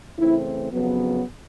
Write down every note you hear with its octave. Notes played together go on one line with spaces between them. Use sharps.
C#3 E3 A3 C4 E4
F2 C#3 F#3 B3